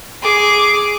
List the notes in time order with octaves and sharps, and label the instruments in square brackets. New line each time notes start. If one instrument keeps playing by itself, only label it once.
[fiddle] G#4 D6